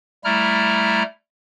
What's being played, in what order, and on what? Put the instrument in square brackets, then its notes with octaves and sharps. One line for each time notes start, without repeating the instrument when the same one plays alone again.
[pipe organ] G3 A3 E4 A#5 F6